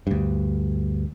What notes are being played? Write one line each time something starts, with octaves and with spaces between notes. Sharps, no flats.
D2 G2